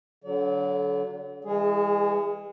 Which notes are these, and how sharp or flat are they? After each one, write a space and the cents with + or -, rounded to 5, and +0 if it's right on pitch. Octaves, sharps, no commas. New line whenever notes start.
D3 -30 F#3 +0 D5 -45
E3 +0 G#3 -35 G#4 +0